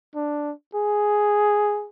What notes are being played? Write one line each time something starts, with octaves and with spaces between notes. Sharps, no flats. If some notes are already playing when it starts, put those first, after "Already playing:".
D4
G#4